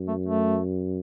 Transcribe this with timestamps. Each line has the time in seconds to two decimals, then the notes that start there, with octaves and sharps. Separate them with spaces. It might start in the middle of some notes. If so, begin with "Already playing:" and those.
Already playing: F#2
0.08 A3
0.26 A3